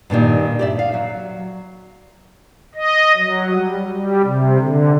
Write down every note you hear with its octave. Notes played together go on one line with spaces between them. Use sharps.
G2 A#2 D#3 G3
G4 D5 E5
F5
F#3
D#5
F#3
G3
G3
C3
D3